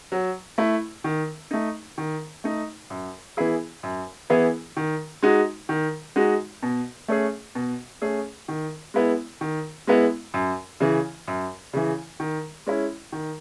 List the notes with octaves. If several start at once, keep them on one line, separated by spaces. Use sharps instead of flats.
F#3
A3 E4
D#3
A3 D#4
D#3
A3 D#4
F#2
E3 B3 E4 G#4
F#2
E3 B3 E4 G#4
D#3
G#3 D#4 F#4
D#3
G#3 D#4 F#4
B2
A3 C#4 G#4
B2
A3 C#4 G#4
D#3
G#3 B3 E4
D#3
G#3 B3 E4
F#2
C#3 E3
F#2
C#3 E3
D#3
G#3 C#4 E4
D#3